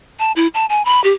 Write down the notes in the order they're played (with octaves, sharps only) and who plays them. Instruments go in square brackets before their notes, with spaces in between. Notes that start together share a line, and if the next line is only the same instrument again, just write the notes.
[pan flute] A5
E4
A5
G#5
B5
G4